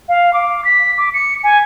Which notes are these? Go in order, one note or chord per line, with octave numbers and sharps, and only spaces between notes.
F5
D6
B6
D6
C#7
G#5